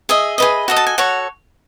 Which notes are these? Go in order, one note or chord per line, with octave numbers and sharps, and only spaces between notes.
G#4 D#5 E5
G#4 B4 D#5
F#4 A4 D#5
A5
G#5
F#4 A4 C#5 F#5